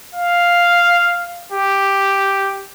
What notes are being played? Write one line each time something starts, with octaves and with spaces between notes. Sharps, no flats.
F5
G4